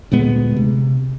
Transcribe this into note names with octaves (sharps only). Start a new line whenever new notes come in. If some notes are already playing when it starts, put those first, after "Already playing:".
D2 A#2 G#3 B3
C3